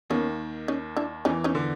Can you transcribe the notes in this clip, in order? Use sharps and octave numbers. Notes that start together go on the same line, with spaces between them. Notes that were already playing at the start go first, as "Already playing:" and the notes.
D#2 D#3 B3 C#4
C#4 D#4
D4 E4
E2 E3 C#4 D#4
C#4 D#4
D3